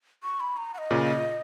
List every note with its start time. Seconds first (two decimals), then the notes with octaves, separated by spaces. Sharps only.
0.23 C#6
0.40 B5
0.57 A#5
0.74 F#5
0.78 D#5
0.90 A#2 C#3